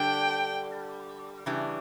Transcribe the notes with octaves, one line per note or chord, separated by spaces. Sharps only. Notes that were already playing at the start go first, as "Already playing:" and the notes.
Already playing: D3 G3 D4 G5
C#3 E3 G3 D4